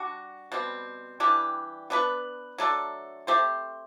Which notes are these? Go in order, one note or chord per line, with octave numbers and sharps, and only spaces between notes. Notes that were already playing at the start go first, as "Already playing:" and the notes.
Already playing: G3 D4 F#4
B2 G3 C4
E3 G3 D4 G4
B3 D4 G4 B4
F#3 A3 D4 A4
A3 C4 G4 C5